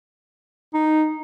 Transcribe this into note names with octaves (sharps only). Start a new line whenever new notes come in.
D#4